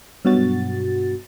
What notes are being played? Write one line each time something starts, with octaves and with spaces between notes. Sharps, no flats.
G2 B2 F#3 F#4 A6